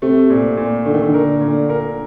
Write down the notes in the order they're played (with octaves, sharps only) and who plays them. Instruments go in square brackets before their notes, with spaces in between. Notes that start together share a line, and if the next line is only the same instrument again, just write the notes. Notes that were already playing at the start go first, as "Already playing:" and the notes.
[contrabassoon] C3 [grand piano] A3
[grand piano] A#2
A#2
[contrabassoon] D3 [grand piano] A3
[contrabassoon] D#3
D3
[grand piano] A#4
A#2
A#4